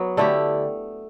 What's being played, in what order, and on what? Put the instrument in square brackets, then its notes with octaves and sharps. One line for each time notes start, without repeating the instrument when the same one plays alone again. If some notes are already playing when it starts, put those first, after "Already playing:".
Already playing: [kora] F#3 B3
D3 A3 E4 G4